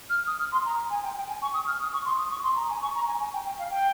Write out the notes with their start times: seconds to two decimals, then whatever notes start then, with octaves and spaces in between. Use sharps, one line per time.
0.10 F6
0.27 D#6
0.39 F6
0.52 C6
0.66 A#5
0.90 G#5
1.03 G5
1.16 G5
1.29 G#5
1.42 C#6
1.54 D#6
1.67 F6
1.80 D#6
1.93 C#6
2.05 C6
2.18 D#6
2.31 C#6
2.43 C6
2.56 A#5
2.70 G#5
2.82 C#6
2.95 A#5
3.07 G#5
3.20 G#5
3.33 G5
3.46 G5
3.59 F5
3.71 G5